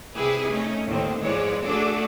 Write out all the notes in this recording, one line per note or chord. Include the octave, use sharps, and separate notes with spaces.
C3 G3 E4 G4 G#4 B4
A3 C#4 D#4
D#2 A2 D3 D#3 C4
G#2 E3 F3 G#3 C#5 D5
A3 D4 F#4 G#4 A4 D5